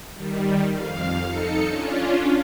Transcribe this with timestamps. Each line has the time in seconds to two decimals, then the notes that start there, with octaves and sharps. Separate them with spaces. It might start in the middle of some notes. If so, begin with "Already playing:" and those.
0.15 D#3 G3
0.71 F2 F5
1.25 D#4 A4 C#7
1.67 C#4 D4 F4